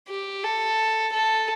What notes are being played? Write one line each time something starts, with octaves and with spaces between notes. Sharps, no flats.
G4
A4
A4